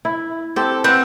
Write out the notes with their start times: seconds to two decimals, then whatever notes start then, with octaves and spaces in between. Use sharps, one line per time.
0.05 E4
0.56 C4 G4 A4
0.84 C4 B4 F#5